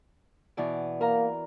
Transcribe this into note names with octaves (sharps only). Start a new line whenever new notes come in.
B2 E3 D5
A#3 A#4 A#5